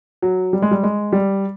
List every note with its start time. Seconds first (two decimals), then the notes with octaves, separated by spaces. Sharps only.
0.22 F#3
0.53 G3
0.62 G#3
0.71 G3
0.83 G#3
1.12 G3